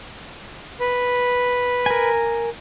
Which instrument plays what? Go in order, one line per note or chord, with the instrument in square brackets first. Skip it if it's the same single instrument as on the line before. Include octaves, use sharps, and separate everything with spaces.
[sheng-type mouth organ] B4
[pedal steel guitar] A#4 G#5